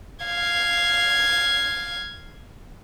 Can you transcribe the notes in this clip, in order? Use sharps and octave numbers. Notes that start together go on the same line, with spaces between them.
F5 G#6